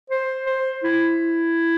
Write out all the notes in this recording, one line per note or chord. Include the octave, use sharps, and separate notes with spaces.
C5
C5
E4